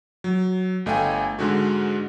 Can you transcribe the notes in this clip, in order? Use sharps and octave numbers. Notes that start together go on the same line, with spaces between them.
F#3
G1 A3 D#5 F5 G5 G#5
G#2 D3 G#3 F#4